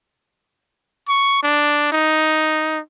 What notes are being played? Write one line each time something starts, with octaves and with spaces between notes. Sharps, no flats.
C#6
D4
D#4